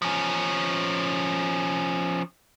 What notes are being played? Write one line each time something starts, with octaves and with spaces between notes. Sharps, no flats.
F3 C#4